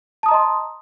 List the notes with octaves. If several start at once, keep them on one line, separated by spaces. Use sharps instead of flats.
D#5 A5 A#5 C6 D#6